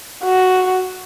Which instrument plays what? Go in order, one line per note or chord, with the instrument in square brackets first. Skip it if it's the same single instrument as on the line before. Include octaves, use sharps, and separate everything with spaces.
[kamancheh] F#4